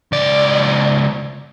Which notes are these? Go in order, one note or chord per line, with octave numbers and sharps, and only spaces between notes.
C#2 D5